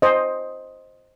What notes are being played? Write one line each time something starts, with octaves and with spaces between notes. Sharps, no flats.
C5 D#5